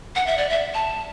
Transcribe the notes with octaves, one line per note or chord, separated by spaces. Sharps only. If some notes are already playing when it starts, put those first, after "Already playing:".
F#5
E5
D5
E5
A5